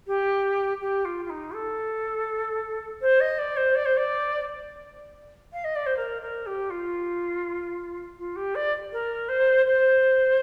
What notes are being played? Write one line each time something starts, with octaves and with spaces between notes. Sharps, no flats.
G4
G4
F4
F4
D#4
A4
C5
D#5
D5
C5
D5
C5
D5
F5
D#5
D5
C5
A#4
A#4
G4
F4
F4
G4
D5
A#4
C5
C5